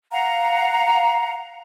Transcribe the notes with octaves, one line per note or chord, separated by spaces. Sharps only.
F5 F#5 A#5